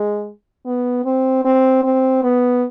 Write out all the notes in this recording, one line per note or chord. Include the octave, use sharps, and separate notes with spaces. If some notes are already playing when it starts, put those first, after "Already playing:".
Already playing: G#3
B3
C4
C4
C4
B3